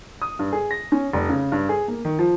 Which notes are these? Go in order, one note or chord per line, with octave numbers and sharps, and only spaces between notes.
D#6
G2
G#4
A#6
C#4
F1
C#3
G2
G#4
A#3
D#3
F3